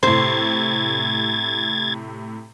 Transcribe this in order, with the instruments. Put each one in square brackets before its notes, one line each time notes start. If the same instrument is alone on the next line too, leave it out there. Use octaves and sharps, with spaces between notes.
[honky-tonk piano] A2 C3 [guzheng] C5 [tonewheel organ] G#6 A6